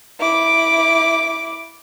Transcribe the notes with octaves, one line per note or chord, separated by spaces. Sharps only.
E4 D6